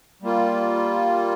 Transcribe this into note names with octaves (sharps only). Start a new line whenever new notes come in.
G3 A#3 F4